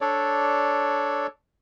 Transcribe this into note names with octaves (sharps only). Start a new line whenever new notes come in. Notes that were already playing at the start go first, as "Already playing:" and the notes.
D4 A4 C#5 D5